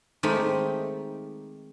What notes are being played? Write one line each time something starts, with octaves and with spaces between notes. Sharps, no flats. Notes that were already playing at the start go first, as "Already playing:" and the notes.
D#3 G#3 A3 C4 D#4 G4